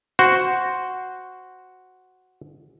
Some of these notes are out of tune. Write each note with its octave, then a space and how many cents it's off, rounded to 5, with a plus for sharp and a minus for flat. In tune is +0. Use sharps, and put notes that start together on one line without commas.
F#4 +0 C5 +0